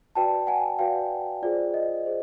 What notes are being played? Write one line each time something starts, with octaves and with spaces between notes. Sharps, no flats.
F#4 B4 D5 G5 A5
F#5 G#5
F#4 B4 D5 F5 G5
F4 G#4 C5 D5
D#5
G#4 C5